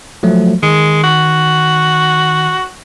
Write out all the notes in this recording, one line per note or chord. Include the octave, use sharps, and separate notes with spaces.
F3 F#3 A3
D#3 G#3
F#4